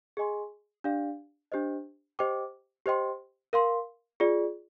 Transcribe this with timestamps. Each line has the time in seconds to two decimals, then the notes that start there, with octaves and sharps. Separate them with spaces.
0.17 G#4 D#5 G#5 C6
0.84 D4 G4 D5 F5
1.52 D4 G4 C5 D#5
2.19 G4 C5 D#5 G5 D6
2.86 G4 C5 D#5 G5 C6
3.53 A#4 F5 C6
4.20 F4 G#4 D5